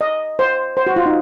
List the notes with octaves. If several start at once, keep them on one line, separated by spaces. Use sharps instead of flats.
D#5
C5
C5
F#4
F4
D#4